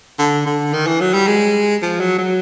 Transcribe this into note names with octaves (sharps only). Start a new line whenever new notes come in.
D3
D3
D#3
E3
F#3
G3
G#3
F3
F#3
F#3